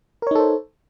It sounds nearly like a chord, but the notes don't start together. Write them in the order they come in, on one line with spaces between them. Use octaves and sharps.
A#4 C#5 D#4 A4 C5